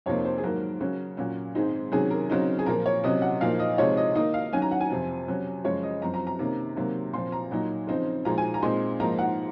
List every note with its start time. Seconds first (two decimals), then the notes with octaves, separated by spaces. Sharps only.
0.06 F2 C3 F3 A#3 D#4 C#5
0.25 C5
0.38 G#4
0.43 G#2 D#3 F#3 A#3 A#4
0.80 C#3 F#3 C#4
1.17 A#2 F#3 C#4
1.55 G#2 D#3 G#3 C4 D#4
1.92 C3 D#3 F#3 C#4 G#4
2.11 A#4
2.30 C#3 F#3 C4 D#4
2.59 G#4
2.66 A#2 F3 A#3 A#4
2.86 C#5
3.04 C3 F#3 C#4 D#5
3.22 F#5
3.41 A#2 F3 A#3 D#4 F5
3.59 D#5
3.78 C3 F3 G#3 D#4 C#5
3.97 D#5
4.15 D#3 A#3 D#4 D#5
4.34 F5
4.53 D#3 F#3 C#4 G#5
4.62 A#5
4.71 F#5
4.81 G#5
4.90 F2 C3 F3
5.27 C3 F#3 C#4
5.65 F#2 C#3 F3 G#3 C#5
5.83 D#5
6.02 F#2 F3 C4 A#5
6.14 A#5
6.27 A#5
6.39 C3 D#3 A#3 C#4
6.76 C3 D#3 F#3 A#3
7.13 A#2 F3 C4 C6
7.32 A#5
7.51 A#2 F#3 A#3 D#4
7.87 C#3 F3 C4 D#4
8.25 A#2 F3 G#3 D#4 A#5
8.38 G#5
8.54 A#5
8.62 A#2 G#3 C4 D#4 C6
9.00 G#2 F3 A#3 D#4 A#5
9.19 F#5